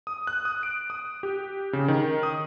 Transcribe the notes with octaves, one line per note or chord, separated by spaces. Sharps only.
D#6
F#6
D#6
D7
D#6
G4
C#3
D#3
D#6